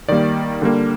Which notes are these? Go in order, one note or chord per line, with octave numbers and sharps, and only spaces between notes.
D#3 G3 A#3 D5
D3 G3 A#3